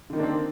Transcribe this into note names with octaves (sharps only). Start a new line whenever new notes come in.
D3 D#3 A#3 C4 D4